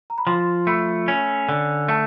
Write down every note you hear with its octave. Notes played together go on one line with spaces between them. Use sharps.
A#5
B5
F3 C6
A3 B5
C#4
D3
A3 A5